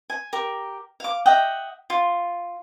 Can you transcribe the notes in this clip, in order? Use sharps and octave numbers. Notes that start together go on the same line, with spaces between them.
G#5
G4 A#4
F5 D6
D#5 E5 F#5 G5
F4